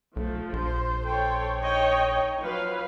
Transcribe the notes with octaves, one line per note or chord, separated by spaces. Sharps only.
B1 F3 A3
A#1 C5
A4 C5 C#5 G5
D#4 C#5 D#5 G5
F3 F#3 B4 F5